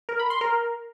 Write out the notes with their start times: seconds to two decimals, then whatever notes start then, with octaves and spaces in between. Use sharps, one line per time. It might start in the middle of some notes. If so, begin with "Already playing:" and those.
0.09 A#4
0.19 B5
0.30 C6
0.41 A#4